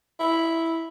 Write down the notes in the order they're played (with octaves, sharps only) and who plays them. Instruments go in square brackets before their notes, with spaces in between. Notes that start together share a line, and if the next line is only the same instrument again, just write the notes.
[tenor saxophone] E4